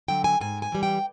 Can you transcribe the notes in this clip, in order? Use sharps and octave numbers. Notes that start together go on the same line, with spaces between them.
D3 F#3 G5
G#5
G#2 G#5
G#5
E3 G3
G5